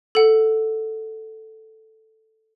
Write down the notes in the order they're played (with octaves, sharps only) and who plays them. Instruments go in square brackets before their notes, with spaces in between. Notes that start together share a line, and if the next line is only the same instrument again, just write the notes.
[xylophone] A4 F#5